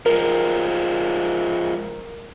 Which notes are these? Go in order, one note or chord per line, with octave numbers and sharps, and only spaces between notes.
F3 G#3 A#4